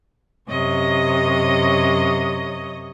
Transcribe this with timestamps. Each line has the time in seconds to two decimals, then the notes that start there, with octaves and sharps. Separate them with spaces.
0.48 F#2 C3 C#5 D#5 D#6